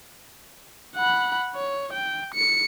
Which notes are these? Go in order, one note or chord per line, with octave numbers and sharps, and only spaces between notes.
F#5 B5
C#5
G5
C#7